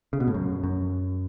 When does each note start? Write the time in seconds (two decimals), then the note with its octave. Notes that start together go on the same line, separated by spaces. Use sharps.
0.13 C#3
0.20 B2
0.28 A2
0.34 F#2
0.64 F#2